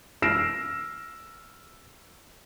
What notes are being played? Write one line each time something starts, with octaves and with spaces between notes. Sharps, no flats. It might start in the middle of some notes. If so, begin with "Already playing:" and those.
E6 F6 A#6 C7 D7 E7